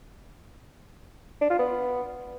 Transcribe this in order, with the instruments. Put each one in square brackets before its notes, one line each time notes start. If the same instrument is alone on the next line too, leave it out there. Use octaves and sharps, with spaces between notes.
[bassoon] D4
F4
B3